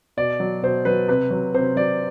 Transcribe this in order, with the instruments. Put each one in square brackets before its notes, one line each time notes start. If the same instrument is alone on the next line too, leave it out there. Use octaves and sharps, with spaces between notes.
[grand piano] B2 D5
F#3
B2 C5
F#3 B4
C3 B4
F#3
C3 C5
F#3 D5